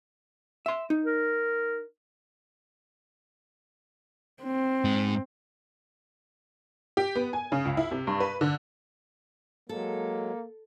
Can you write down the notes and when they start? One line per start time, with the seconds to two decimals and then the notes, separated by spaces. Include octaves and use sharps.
0.66 E5 C6
0.90 D#4
1.05 A#4
4.43 C4
4.84 G#2 G#3
6.97 G4
7.15 B3
7.33 G#5
7.52 C#3
7.65 C#2
7.77 E4
7.91 C3
8.07 G2
8.20 B4
8.41 D3
9.69 F#3 G#3 A#3 A4